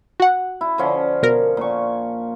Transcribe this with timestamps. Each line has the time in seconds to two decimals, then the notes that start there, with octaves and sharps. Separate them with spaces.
0.20 F#4 F#5
0.61 E4
0.78 D3 F3 C#4
1.22 B2 A#4
1.57 A#2 C#6